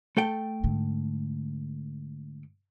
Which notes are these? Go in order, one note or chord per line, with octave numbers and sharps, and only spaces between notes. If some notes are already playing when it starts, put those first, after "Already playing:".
A3 A4 G5
G#2 D3